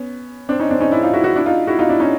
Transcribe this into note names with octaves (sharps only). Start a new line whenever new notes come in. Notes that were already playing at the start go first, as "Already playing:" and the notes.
Already playing: B3 C#4
C4 D4
C#4 D#4
C4 D4
C#4 D#4
D4 E4
D#4 F4
E4 F#4
E4 F#4
D4 E4
D#4 F4
E4 F#4
D#4 F4
D4 E4
C#4 D#4